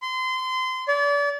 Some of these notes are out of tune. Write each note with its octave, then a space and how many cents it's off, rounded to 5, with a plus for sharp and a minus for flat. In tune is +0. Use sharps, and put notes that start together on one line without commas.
C6 -25
D5 -35